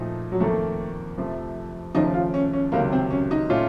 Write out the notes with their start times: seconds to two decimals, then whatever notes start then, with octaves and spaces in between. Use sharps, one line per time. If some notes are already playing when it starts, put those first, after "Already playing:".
Already playing: A#2 F3 A3 D#4
0.32 F#3
0.40 F2 D#3 A3 A#3
1.18 F2 C3 F3 A3
1.94 D#2 C#3 F3 A3 D#4
2.14 F4
2.34 C#4
2.53 C#4
2.72 C#2 C3 D#3 F#3 A#3
2.92 C4
3.11 C#4
3.31 D#4
3.50 A#2 A3 C#4 F4